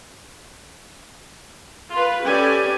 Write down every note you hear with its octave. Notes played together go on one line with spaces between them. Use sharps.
F4 B4
C#4 G4 A4 B4 D5 G#5